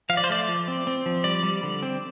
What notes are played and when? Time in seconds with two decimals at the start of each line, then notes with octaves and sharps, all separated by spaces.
0.09 F3 F5
0.17 D5
0.24 C5
0.30 A3 D5
0.48 F3
0.68 C4
0.87 C4
1.06 F3
1.24 G3 D5
1.43 G3
1.63 D3
1.83 C4